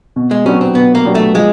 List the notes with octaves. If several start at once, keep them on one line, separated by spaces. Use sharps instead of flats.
B2
G#3
F#3 B3 C#4 D4 G4
C4
B2 B3
A#3
F#3 B3 D4 G4
A3
F3 G#3